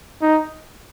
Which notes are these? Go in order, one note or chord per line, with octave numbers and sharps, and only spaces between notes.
D#4